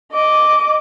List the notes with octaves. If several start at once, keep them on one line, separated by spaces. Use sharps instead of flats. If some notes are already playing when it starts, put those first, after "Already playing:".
D#5 D6